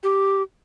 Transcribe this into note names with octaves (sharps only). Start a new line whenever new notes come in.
G4